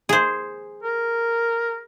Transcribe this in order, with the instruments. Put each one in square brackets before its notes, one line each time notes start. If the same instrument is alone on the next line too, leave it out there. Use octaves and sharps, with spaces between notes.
[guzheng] G#4 C5
[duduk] A#4